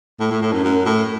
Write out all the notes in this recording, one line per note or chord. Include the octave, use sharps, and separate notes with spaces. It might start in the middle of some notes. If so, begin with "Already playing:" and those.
A2
A2
A2
F#2
F#2
A2